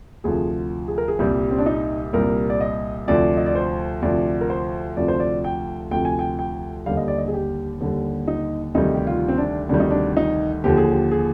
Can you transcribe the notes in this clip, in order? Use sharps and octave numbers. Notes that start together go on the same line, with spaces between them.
D2 C3 F3 G#4
G#4
A#4
G#4
C2 A#2 G3 G4
C4
D4
D#4
C2 A#2 G3 A#4
D5
D#5
D2 C3 F3 D5
D#5
D5
C5
D2 C3 F3 D5
A#4
C5
D2 C3 F3 D5
C5
D5
G5
D2 C3 F3 G5
G#5
G5
G5
D#2 D3 G3 F5
D#5
D5
D#5
G#4
G4
D#2 D3 G3
D#4
D2 C3 D#3 G3 D#4
G4
F4
C4
D4
D2 C3 D#3 G3 D4
D#4
D4
D#4
D#2 D3 F3 G4
G#4
G4
G#4